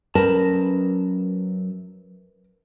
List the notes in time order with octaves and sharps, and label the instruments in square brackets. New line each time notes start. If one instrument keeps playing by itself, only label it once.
[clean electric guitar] F#2 A5 [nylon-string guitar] A#4 B4